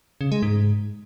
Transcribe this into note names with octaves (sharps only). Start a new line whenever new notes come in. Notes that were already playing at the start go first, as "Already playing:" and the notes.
C#3
G#3
G#2